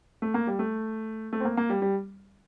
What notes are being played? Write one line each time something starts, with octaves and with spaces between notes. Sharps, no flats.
A3
A#3
G3
A3
A3
C4
A#3
A#3
G3
G3